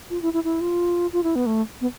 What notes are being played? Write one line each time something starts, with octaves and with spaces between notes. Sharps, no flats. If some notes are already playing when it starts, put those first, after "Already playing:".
F4
E4
E4
E4
F4
F4
E4
B3
A3
B3